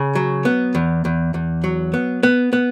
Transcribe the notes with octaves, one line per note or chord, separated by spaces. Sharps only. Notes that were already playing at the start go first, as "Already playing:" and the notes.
Already playing: C#3
F#3
B3
E2
E2
E2
F#3
B3
B3
B3